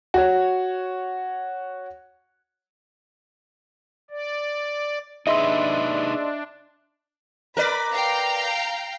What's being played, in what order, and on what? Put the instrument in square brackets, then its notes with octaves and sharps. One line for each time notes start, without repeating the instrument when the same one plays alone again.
[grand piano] F#4 C#5
[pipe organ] D5
[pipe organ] D4 [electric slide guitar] D#4 G#4 B4 [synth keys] D#5 C6 E6 [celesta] E5
[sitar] A#4 B4 D5 [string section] B5
[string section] F5 G5 A#5